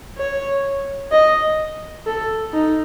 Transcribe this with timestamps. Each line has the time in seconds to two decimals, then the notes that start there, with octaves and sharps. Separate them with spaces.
0.18 C#5
1.12 D#5
2.07 A4
2.53 D#4